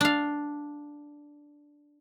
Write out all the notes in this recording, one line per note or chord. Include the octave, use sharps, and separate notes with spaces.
D4 F5